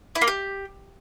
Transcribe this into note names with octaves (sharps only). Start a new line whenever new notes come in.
E4
A#3
G4